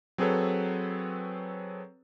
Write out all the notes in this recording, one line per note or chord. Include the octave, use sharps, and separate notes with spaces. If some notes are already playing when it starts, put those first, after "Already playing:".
F#3 C4 G#4 A4 B4 C#5